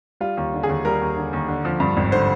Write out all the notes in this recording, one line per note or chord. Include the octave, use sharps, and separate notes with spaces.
G3 F4
D#2
D3
G#4
D#2
G3 A#4
D#2
D3
D#2
D3
F3
G2
G#1
D3 C5